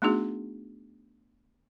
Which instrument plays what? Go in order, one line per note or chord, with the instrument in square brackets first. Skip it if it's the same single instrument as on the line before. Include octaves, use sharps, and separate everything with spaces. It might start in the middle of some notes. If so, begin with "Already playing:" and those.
[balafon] A3 B3 D4 D#4 F#4 G#4